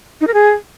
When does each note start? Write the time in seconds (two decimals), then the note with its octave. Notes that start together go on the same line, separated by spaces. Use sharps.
0.21 D#4
0.27 A#4
0.34 G#4